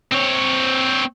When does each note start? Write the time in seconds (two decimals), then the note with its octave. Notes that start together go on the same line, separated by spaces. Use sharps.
0.12 C4 C#5